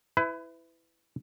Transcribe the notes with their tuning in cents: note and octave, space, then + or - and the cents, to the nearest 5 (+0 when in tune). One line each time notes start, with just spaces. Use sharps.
E4 +0 B4 +30